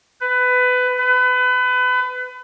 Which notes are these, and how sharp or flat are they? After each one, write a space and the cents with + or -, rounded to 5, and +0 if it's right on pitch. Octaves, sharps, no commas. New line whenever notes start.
B4 +20
B4 +30